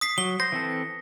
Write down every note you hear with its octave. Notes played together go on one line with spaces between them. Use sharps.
D#6 B6 C7
F#3 G7
C5 A#6
E3 C4 A4